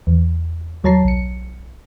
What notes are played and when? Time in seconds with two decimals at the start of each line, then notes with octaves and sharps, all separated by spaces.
0.07 E2
0.84 D#2 F#3 C#5 A5 A#5 C7
1.04 B1 C#7